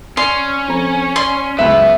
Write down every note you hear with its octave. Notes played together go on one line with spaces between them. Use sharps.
C#4 D5 C6
F2 A#5
D5 C6
C#2 F#2 B3 E5